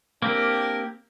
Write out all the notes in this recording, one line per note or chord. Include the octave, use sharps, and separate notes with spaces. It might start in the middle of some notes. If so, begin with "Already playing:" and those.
A#3 C4 D4 G4 A#4